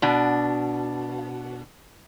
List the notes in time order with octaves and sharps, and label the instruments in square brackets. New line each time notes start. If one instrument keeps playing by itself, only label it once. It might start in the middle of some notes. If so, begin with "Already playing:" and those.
[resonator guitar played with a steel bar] B2 D4